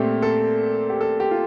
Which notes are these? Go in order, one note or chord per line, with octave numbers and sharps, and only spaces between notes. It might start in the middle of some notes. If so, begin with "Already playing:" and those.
Already playing: A#2 A3 C4 G4
A4
G4
A4
G4
F4